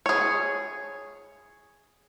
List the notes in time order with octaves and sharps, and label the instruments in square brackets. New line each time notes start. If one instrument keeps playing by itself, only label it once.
[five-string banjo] G#4 C#5